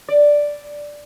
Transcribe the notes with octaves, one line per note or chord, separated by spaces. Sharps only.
D5